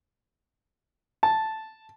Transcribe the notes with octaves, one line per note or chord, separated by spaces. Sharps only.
A5